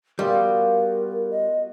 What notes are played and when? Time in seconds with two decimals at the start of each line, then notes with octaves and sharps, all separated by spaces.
0.19 G3 B3 F4 F#4 A#4
1.31 D#5